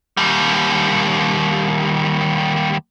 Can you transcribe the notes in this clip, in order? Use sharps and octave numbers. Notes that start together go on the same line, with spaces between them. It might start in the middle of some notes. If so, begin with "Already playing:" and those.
D#2 G3